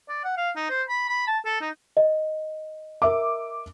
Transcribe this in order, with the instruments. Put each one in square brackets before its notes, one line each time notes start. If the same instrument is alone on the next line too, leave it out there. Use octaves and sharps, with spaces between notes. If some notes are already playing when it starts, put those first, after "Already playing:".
[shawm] D5
F#5
F5
D#4
C5
B5
B5
A5
A4
D#4
[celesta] D#5
[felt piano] A#4 E5 D6